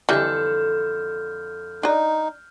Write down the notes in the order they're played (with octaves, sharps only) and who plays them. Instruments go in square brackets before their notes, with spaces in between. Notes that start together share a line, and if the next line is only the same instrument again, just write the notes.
[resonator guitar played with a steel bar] F2 D3 A4 [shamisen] E3 G3 [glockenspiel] F6 G6
[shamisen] D4 D#5 [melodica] D#4